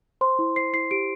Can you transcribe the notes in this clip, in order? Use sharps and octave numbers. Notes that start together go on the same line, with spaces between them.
C5 C6
E4
C5 C7
E4 C7
G4 D7